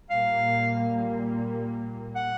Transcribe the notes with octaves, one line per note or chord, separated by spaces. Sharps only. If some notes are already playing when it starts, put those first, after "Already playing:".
A#2 G3 A#3 F5
F#5